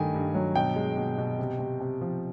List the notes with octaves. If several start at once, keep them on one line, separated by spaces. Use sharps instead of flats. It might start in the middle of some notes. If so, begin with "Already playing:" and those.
Already playing: G2 D#3 A3 G#5
G2
F#3
B2 G5
G#3
B2
B2
C3
C3
C3
F3